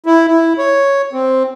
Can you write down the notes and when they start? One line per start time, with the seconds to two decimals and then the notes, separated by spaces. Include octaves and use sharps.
0.06 E4
0.28 E4
0.58 C#5
1.13 C4